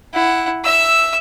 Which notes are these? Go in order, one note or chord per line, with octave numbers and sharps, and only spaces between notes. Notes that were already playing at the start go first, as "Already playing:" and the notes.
E4 F#5
E5 E6